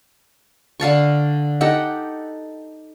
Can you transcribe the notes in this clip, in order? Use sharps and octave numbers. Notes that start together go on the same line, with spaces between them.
D3 F5 A5 C#6
D#4 G4 A4 F#5